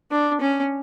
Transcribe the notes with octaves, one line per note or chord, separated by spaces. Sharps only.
D4
C#4